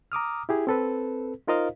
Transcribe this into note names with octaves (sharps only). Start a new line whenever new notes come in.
A#5 D6 D#6 F6
E4 G4 G#4
C4 A4 B4
D#4 F4 A#4 C5 D#5 F5